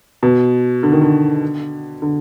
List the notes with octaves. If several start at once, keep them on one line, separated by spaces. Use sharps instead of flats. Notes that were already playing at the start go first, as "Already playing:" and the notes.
B2
D3
D#3
D3
D3